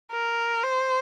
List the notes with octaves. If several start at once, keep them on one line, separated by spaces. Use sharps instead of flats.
A#4
C5